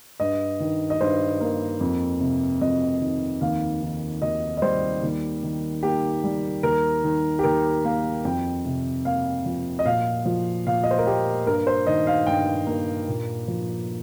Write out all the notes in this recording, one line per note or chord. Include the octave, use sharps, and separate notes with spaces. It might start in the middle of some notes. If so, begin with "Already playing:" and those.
G2 D#5
D#3
D#5
G2 C5
A#3
F2
C3
F2 D#5
D#3
D#2 F5
D#3
D#2 D#5
D#5
G3 C5
D#2
D#3
A#3 G4
G3
D#2 A#4
D#3
G4
D#2 A#4
A#3 F5
F2 G5
C3
A#3 F5
F3
D#5
A#2 F5
F3
A#2 F5
D#5
C5
A#4
A#3 G4
G2 A#4
C5
D#3 D#5
F5
G2 G5
A#3
A#2
F3